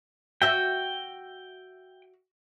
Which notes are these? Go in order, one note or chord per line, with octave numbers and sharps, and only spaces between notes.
F#4 E5 G5